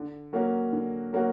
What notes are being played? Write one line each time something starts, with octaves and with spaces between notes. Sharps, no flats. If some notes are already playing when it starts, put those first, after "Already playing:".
Already playing: D3
F#3 A#3 C#4 F#4
D3
F#3 A#3 C#4 F#4